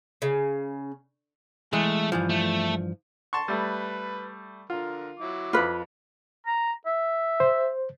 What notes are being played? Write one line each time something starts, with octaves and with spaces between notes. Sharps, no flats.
C#3
E3 G#3 A3
G2 E3 F3
A3
A5 C6 C#6
G3 A3 B4
D3 F4 A#4
F#3 E4 D6
F2 F4 B4 B5
A#5
E5
C5